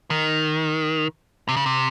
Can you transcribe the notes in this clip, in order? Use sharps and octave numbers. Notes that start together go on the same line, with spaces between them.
D#3
C3
C#3
C3